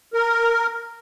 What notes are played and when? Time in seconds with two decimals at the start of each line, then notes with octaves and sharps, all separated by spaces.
0.14 A#4